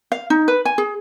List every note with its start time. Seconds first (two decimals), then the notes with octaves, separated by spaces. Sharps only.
0.12 F5
0.30 D#4
0.48 B4
0.65 G#5
0.78 G#4